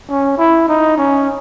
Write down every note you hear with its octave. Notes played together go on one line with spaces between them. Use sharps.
C#4
E4
D#4
C#4